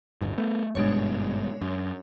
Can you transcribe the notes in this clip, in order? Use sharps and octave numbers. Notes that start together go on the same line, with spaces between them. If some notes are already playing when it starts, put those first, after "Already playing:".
D1 G1 G2
A3 B3
G#1 G2 B2 G#3 D4 C#5
F#2